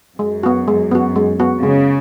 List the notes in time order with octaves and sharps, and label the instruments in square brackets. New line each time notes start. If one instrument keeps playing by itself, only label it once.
[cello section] F#2 [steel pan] G#3
[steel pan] B3 F#4
G#3
B3 F#4
G#3
B3 F#4
[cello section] C#3 [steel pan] G#3